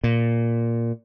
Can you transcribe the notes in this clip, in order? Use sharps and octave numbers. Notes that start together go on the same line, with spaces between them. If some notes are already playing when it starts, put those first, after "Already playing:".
A#2